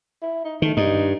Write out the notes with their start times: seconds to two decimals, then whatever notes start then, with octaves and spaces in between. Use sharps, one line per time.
0.22 E4
0.44 D#4
0.62 D#3 A3
0.77 G2 D#4